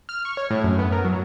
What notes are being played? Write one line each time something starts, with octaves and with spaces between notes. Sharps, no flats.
F6
C#6
C#5
A2
F#2
B3
A#4
F#3